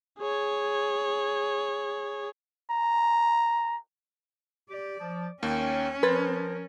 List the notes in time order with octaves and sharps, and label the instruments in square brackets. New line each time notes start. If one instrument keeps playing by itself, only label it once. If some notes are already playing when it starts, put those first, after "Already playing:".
[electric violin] G#4 C#5
[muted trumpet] A#5
[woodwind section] G4 [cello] D5
[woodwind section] F3
[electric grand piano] D#2 A#3 [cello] C#4 [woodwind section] C#5 G5
[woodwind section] F3 A#4 [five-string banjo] B4 [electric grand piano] C6 G#6 A6